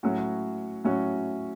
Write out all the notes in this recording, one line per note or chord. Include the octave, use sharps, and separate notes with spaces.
A2 F#3 C#4 F#4
A2 F#3 C#4 F#4